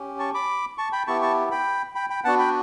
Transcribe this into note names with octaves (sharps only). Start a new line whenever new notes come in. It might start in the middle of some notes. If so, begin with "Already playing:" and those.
Already playing: C#4 G4
A5 C#6
B5 D6
A5 C#6
G5 B5
B3 E4 G4 A5 C#6
A5 C#6
G5 B5
G5 B5
G5 B5
B3 D4 F#4 F#5 A5
G5 B5